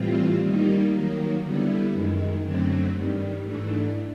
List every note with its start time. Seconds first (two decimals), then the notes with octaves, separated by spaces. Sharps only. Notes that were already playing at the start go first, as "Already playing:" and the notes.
Already playing: A2 E3 G3 C4 F4
0.42 D#3 G3 A#3 D#4
0.92 D#3 F#3 A#3
1.42 D3 G3 B3 E4
1.92 F#2 D#3 G#3
2.43 F#2 D3 F#3 A3 C4
2.94 G2 D#3 G3
3.43 G#2 E3 A3 D4